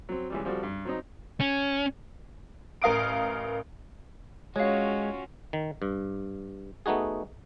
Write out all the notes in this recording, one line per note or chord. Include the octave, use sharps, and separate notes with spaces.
F#3 C4
C#2 E3 G3
F3 G3 C4 F#4 A4
G2
F#3 C4 D#4
C#4
A1 A#4 F5 D#6 D7
G#3 C#4 F4 F#4 C#5 F5
D#3
G2
A3 B3 D#4 F#4 G#4